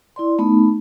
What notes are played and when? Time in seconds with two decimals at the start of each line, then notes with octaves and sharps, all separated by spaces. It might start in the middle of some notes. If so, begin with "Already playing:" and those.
0.16 E4 D5 C6
0.38 A3 B3 D#4